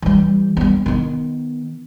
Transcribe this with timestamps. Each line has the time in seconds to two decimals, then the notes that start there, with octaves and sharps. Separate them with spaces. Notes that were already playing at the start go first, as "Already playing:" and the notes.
0.02 E3 G3
0.57 G3 B3
0.86 D#3 B3